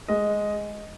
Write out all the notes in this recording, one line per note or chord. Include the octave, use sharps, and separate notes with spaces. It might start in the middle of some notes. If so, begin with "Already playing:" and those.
G#3 D#5